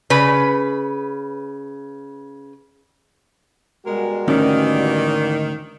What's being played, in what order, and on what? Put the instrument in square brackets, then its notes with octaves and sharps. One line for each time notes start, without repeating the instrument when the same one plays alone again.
[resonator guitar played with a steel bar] C#3 B4
[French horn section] B2 G3 F#4 [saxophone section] G#3 A#4
[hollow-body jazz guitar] D2 G#2 C#4 [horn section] D#3 [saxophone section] E3 D5 F5